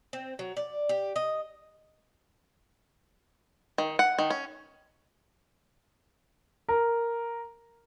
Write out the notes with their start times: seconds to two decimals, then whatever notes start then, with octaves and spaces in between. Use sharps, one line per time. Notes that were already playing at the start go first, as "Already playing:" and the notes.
0.13 C4
0.39 F#3
0.57 D5
0.89 G4
1.16 D#5
3.78 D#3
3.99 F#5
4.19 D#3
4.30 C#4
6.69 A#4